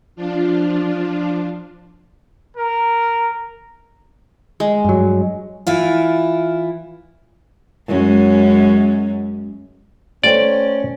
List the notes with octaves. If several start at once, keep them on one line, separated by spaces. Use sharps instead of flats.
F3 D4 F4
A#4
G#3
G2 F#3
E3 E4 F4
F#2 G#3 C#4
A3 C#4 C5 D5 G5